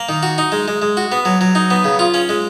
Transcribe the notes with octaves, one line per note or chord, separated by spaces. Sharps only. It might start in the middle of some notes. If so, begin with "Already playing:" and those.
Already playing: A#3
D#3
F#4
D#4
G#3
G#3
G#3
F#4
B3
F#3
F#3
D#4
B3
C#3
F4
C#4
G#3